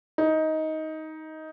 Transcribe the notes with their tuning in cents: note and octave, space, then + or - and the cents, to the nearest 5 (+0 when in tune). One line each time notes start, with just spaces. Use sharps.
D#4 +15